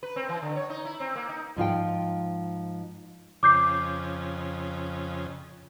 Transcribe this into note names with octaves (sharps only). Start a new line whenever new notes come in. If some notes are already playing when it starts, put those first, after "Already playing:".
B4
C4
E3
D3
C#5
D#4
E4
C4
A#3
D#4
G#2 F3 F4 G5
F2 C#3 D6 G6 C7